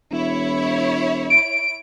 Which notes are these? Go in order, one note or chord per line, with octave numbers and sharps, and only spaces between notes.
E1 E4 C#5
D7